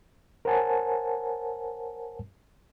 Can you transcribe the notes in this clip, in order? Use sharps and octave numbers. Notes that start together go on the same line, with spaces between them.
A#4 C5 C#5 F#5 G#5 A5